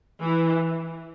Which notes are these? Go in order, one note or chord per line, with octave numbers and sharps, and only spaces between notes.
E3